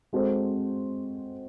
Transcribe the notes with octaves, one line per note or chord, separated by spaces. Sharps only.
G#3 C4 F#4 A4 C5